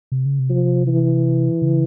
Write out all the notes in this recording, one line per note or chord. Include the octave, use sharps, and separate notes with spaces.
C3
C#3
C3
F3
E3
C#3